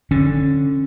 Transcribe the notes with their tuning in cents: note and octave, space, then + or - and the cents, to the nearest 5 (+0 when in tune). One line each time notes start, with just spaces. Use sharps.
D3 +0 C#4 -25